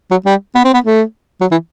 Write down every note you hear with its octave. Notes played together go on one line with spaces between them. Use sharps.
F#3
G3
B3
C4
B3
A3
F#3
E3